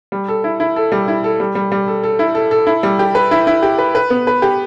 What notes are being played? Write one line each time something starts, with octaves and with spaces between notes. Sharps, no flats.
G3
A4
E4
E4
A4
G3
E4
A4
G3
G3
G3
A4
A4
E4
A4
A4
E4
G3
G4
B4
E4
E4
G4
B4
B4
B3
B4
G4